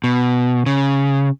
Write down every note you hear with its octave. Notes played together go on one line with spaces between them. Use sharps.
B2
C#3